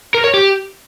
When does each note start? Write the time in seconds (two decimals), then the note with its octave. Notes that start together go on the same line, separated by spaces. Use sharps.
0.15 A#4
0.24 C#5
0.34 G4